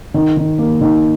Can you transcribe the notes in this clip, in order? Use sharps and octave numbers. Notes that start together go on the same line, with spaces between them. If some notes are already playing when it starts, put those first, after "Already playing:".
D#3
D#3
A#3
D#3